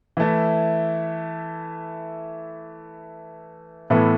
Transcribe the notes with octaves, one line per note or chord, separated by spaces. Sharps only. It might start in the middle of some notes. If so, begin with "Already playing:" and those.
E3 A3 E4
A2 E3 B3 E4 A4